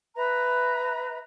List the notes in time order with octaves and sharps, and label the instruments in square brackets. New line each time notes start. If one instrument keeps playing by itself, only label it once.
[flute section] B4 E5 A#5